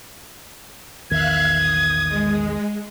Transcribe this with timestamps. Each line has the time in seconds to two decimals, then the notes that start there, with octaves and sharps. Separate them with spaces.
1.10 A#1 E2 D#3 E5 F5 F#6 G#6
1.58 D#6
2.09 G#3